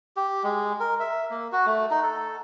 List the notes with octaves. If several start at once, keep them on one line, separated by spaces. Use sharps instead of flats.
G4
G#3
A#4
E5
A#3
F#4
A3
D#4
A4